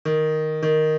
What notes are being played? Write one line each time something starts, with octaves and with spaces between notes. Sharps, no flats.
D#3
D#3